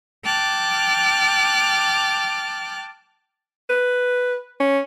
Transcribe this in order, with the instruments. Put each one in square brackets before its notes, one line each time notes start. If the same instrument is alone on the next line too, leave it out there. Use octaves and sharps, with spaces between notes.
[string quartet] G5 A5 D6 F6 F#6
[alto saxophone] B4
C#4